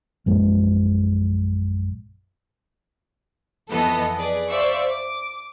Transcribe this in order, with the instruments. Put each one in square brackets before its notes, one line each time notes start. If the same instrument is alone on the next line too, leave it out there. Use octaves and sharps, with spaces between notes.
[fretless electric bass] A#1 F#2 G#3 A#3
[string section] F2 E3 B3 A4 D#5 A5
G#4 B4 D5
C5 D5 E5 F5 C#6 E6
D6